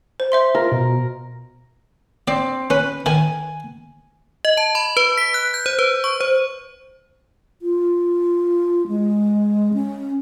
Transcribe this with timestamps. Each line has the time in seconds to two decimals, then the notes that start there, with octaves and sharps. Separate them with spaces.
0.20 C5
0.32 C5 E5 C6
0.55 F4 A#4
0.72 B2
2.28 C4 D5
2.70 C#4 B4
3.06 D#3 G#5
4.45 D#5
4.57 A5
4.75 B5
4.97 B4
5.17 B6
5.34 F#6
5.54 G6
5.66 C5
5.79 B4
6.04 C#6
6.21 C5
7.62 F4
8.88 G#3
9.74 C#4